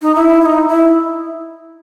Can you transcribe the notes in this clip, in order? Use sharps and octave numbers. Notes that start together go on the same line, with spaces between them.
D#4
E4
E4
D#4
E4